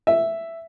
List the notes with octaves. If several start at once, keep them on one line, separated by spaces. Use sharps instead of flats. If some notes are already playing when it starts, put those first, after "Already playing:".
E5